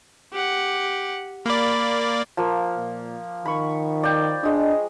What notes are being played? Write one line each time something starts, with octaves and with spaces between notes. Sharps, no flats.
G4 F#5
A#3 D5 B5
F3 A#3
A#2
D#3 B5 C#6
D5 G5
G#3 D4 D#5